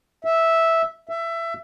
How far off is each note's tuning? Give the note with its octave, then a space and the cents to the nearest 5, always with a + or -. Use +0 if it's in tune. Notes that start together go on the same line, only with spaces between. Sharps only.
E5 -5
E5 +20